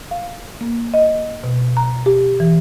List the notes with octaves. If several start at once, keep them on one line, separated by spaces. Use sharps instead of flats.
F5
A#3
D#5
B2
A#5
G4
E3